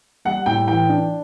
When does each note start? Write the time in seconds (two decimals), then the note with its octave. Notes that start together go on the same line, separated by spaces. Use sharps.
0.25 G3 F#5
0.46 A2 G5
0.68 E3 G5
0.89 D4